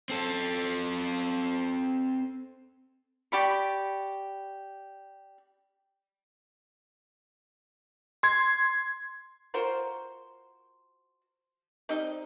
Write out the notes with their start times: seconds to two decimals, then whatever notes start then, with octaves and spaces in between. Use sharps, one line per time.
0.10 C4 A4
3.32 G4 D5 B5 C#6
8.23 C6 G#6
9.54 F4 F#4 A#4 C5
11.89 G3 C4 D#4 D#5